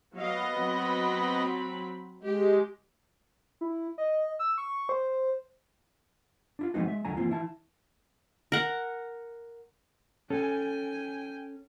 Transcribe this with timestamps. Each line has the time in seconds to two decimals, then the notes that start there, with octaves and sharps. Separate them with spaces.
0.17 F#3 B3 D#5 F5
0.56 F#3 C4 B5
2.23 G#3 G4
3.61 E4
3.98 D#5
4.39 E6
4.58 C#6
4.89 C5
6.59 D4 E4 F4
6.74 F3 G#3 B3 C4 D#4 F#4
6.88 G#3 E5
7.05 C#2 D3 F#3 G#5 A#5
7.17 E3 A#3 C4 F4
7.29 E3 E4 A5
8.52 A#4 F#5
10.30 C#4 A4 G5 G#5